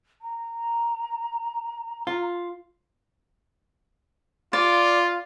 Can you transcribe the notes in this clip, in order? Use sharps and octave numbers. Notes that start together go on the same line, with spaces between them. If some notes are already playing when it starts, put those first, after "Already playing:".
A#5
F4
F4 D5